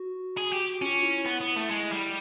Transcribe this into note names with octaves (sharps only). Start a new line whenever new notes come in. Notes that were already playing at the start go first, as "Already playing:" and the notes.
Already playing: F#4
G#4
G4
C#4 F4
E4
B3
B3
A3
G#3
G3